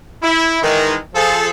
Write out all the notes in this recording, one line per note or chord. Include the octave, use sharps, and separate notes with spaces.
E4
D#3 E3 G#3
F3 G#4 A4